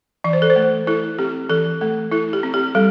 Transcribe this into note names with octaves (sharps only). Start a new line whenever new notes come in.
E3 D5
C5
A4
C5
A3
E4 A4
C4 G4
E3 A4
A3 A4
E4 A4
G4
C4
G4
G3 A4